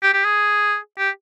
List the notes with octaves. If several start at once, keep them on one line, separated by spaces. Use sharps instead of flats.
G4
G4
G#4
G4